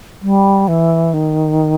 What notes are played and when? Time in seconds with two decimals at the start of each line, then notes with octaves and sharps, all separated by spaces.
0.22 G3
0.68 E3
1.13 D#3